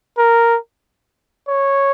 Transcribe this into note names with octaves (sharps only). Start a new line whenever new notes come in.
A#4
C#5